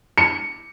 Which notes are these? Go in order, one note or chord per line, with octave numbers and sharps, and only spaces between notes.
C#7